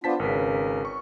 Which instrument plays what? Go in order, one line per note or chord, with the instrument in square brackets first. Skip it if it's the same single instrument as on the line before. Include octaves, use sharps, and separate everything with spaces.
[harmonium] B3 D4 F4 [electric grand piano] C5 A5 B6
[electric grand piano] G#1 B4 [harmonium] C#3 A#4
[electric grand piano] C#6